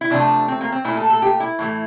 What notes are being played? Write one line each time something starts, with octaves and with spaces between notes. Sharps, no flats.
E4
C3 F3 A3 D4
C4
A#3
C4
A#2 A3 E4
A4
A4
G4
E4
A2 E3 A3